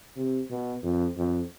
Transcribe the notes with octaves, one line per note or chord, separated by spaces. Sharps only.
C3
B2
F2
F2